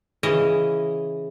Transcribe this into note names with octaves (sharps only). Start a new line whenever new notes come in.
C#3 E3 D#5